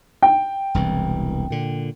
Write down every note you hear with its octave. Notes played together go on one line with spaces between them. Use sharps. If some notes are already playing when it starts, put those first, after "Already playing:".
G5
E1 C2 E3
A#2 D3